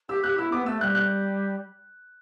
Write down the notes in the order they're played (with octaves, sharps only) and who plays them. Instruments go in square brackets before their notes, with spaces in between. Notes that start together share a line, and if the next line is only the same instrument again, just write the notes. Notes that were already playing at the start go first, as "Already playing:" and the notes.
[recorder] G4 [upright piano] E6
[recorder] G4 [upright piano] F#6
[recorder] E4 [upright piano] E6
[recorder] B3 [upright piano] D6
[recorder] A3 [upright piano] E6
[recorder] G3 [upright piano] F#6
[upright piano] F#6